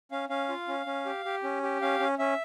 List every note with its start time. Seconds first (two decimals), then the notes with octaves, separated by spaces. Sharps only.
0.11 C#4 F5
0.29 C#4 F5
0.49 F4
0.68 C#4
0.86 C#4
1.06 G4
1.25 G4
1.43 C#4
1.63 G4
1.81 C#4 F5
2.00 C#4
2.19 C#4 E5